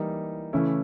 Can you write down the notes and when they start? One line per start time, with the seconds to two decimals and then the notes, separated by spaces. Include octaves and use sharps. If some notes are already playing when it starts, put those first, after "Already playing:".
Already playing: E3 G3 A#3 D#4
0.53 C#3 E3 A3 C#4 E4